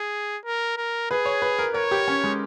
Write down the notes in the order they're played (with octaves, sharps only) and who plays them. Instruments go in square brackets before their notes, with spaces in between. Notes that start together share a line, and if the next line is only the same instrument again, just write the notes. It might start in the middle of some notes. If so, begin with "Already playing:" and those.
Already playing: [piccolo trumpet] G#4
A#4
A#4
[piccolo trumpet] G#4 [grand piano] B4
[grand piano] C#5
B4
A#4
[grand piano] A#4 [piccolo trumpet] C#5
[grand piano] G4
C#4
G#3